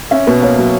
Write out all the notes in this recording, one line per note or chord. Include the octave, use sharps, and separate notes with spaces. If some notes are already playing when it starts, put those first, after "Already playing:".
C#4 E5
B2 B4
A#3 C#5
F#3